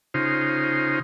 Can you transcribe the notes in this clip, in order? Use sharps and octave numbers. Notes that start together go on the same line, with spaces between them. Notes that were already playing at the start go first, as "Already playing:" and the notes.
C#3 D#4 F4 C5